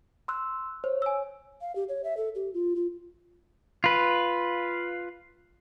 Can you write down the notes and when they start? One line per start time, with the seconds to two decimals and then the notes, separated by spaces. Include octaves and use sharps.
0.28 C6 E6 F#6
0.84 C5 C#5
1.02 G#5 E6
1.61 F5
1.76 G4
1.89 C#5
2.04 E5
2.17 A4
2.35 G4
2.54 F4
2.76 F4
3.84 F4 B4